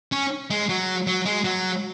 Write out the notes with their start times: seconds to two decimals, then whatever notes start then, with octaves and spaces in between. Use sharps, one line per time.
0.12 C#4
0.50 G#3
0.69 F#3
1.07 F#3
1.26 G#3
1.44 F#3